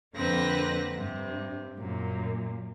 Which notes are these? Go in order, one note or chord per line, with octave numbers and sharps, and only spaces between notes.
F2 D3 A#3 C4 B4 A#6
G2 C3
F#2 A#2